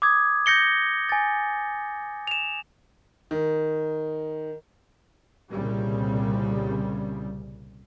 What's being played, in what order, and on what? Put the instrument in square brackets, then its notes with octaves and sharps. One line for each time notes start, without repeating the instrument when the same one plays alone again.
[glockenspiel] D6 D#6 G#6
G6 A#6 C#7 G7
G#5 A6
E7 F7
[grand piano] D#3
[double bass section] C2 A#2 C#3 G3